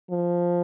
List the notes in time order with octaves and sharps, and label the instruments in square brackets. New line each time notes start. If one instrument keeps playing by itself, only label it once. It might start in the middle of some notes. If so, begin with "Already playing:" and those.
[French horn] F3